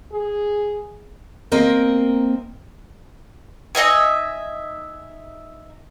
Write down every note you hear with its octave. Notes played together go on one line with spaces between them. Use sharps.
G#4
A#3 C4 A#4 D#5
D#4 D#5 E5 G#5